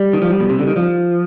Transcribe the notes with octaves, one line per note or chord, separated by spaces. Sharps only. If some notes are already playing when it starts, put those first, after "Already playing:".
Already playing: G3
D#3
F3
G3
B2
C3
D3
D#3
F3